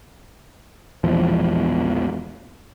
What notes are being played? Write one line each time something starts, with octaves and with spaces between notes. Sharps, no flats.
E1 A#1 E2 F3